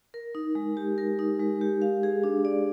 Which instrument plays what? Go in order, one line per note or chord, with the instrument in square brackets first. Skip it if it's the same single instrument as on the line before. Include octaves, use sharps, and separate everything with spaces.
[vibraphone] A#4
D#4
G#3
G4
A#4
D#4
G#3
G4
F5
G#4
D4
D5